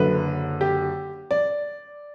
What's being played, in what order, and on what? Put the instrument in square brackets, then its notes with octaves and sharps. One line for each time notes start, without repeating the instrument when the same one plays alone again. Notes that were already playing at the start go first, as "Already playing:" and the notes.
Already playing: [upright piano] F#1 F#2 D3 B4
G4
D5